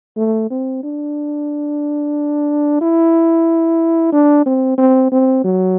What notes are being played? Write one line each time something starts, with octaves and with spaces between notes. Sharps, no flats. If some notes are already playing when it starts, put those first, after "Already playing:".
A3
C4
D4
E4
D4
C4
C4
C4
F#3